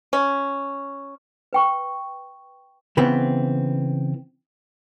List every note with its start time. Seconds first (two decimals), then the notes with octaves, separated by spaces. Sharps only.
0.13 C#4
1.53 B4 G5 C#6
2.97 C#3 E3 B3 C4